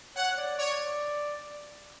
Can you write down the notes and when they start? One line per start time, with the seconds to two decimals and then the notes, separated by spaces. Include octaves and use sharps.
0.16 C#5 F#5
0.38 D5
0.58 C#5 D5